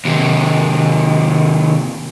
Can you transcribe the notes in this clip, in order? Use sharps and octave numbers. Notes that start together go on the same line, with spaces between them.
D#2 C3